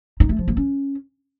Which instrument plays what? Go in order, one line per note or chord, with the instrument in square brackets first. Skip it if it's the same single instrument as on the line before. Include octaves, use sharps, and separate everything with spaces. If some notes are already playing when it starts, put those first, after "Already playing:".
[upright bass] D#4
A3
F3
A#3
C#4